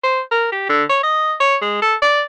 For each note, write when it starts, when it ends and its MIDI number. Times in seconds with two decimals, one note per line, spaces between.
0.04 0.21 72
0.31 0.49 70
0.52 0.66 67
0.69 0.84 50
0.89 1.03 73
1.03 1.34 75
1.40 1.56 73
1.62 1.78 56
1.82 1.95 69
2.02 2.22 74